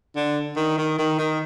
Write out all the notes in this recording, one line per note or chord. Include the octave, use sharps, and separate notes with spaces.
D3
D#3
D#3
D#3
D#3